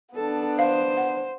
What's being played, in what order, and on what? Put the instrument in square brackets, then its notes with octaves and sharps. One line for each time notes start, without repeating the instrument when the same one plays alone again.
[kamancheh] B3 D4 [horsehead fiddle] A4
[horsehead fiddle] C5 [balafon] F5
[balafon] F#5